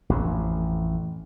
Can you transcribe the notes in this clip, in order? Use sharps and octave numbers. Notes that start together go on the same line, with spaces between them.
A1 F2